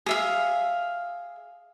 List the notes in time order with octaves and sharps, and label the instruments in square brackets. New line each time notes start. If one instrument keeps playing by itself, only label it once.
[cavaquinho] G#4 E5 F5